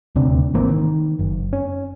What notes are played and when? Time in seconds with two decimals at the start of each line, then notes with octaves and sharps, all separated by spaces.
0.15 D#1 D2 C3 D4
0.54 G#1 E3 A#3 C4
0.69 D#3
1.19 F#1
1.53 C#4